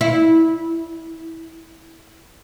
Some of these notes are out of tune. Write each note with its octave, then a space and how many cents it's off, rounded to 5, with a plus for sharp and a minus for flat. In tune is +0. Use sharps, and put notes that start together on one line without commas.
E4 -20